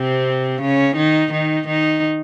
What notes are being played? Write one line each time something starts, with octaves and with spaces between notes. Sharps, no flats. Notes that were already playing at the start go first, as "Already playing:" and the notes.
Already playing: C3 C4
C#3 C#4
D#3 D#4
D#3 D#4
D#3 D#4